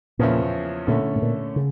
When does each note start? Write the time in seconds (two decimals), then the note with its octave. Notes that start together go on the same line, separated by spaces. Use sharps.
0.19 E2 A#2 C#3 F3 C#4 E4
0.87 A#2 D3 A3 C#4 E4
1.16 A2
1.22 A#2
1.56 C#3